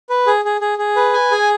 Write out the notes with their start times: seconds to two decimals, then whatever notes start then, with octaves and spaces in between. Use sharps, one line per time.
0.10 B4
0.27 G#4
0.45 G#4
0.61 G#4
0.78 G#4
0.96 B4
1.13 G#5
1.31 G#4